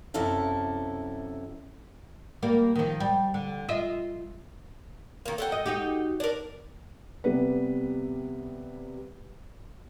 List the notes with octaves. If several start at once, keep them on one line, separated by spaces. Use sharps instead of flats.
F#2 C3 E4 A4 F5
G3 A#3
D#3 F3
G3
D3
F4 D#5 E5
D#3 A#3
A4 F#5 G5
D#5
D#4 F#4 G4
D4 A#4
C3 G3 B3 B4